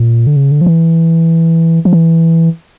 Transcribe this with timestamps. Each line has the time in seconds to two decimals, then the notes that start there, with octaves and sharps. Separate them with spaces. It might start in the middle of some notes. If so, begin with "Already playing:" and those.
Already playing: A#2
0.27 D3
0.36 C#3
0.51 D3
0.61 F3
0.66 E3
1.85 F3
1.93 E3